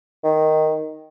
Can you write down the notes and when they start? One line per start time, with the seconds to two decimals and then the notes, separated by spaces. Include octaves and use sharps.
0.24 D#3